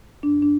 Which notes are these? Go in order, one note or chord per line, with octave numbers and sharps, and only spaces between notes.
G2 D4
D4